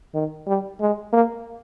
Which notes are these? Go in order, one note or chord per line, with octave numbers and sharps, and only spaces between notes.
D#3
G3
G#3
A#3